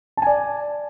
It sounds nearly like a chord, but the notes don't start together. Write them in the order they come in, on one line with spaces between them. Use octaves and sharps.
A5 G#5 D5